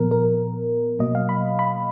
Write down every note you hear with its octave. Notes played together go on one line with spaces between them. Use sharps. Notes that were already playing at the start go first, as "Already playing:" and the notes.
Already playing: A#2 F3 B3 A#4
A#4
B2 F#3 A#3 D#5
F5
B5
B5